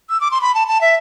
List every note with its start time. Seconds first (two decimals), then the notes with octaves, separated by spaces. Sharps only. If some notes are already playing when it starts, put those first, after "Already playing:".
0.10 E6
0.21 D6
0.31 C6
0.41 B5
0.55 A5
0.68 A5
0.81 E5